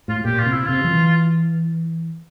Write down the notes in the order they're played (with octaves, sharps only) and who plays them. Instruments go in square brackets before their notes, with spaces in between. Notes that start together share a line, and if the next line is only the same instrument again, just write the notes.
[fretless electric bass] A2 [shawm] F4
[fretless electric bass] A#2 [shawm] G4
[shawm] F4
[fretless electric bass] C3
[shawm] E4
[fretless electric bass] C3 [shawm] F4
[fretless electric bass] F3
E3